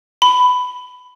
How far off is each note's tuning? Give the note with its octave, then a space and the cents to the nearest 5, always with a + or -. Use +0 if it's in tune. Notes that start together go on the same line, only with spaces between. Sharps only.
B5 +15